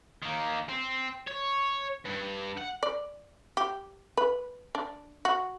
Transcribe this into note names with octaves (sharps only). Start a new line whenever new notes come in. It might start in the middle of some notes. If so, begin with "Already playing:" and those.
D#3 A#3
C4
C#5
G2
F#5
D5
G4
B4
D4
F#4